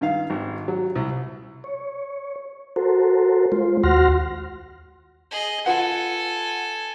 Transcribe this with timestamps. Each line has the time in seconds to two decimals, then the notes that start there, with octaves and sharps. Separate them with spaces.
0.01 G2 D#3 F5
0.30 G#1
0.68 F#3
0.95 C2
1.64 C#5
2.76 F#4 A4 A#4 C5
3.52 G#3 F4 C5
3.84 D#2 F#4 F#5 C6 F6 A#6
5.31 G#4 D#5
5.66 F4 A4 B4 F#5 G#5